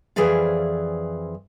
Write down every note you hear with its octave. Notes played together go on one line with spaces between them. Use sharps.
F2 E3 G#4 C5 D5 F5